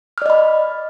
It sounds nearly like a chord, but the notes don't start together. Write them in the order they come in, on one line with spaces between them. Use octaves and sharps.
F6 D5 D#5 B5